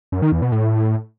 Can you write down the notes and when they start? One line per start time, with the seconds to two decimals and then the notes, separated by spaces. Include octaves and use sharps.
0.12 F#2
0.22 D#3
0.32 E2
0.42 B2
0.52 A2